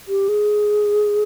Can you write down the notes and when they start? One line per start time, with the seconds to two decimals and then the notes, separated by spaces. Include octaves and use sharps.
0.08 G4
0.29 G#4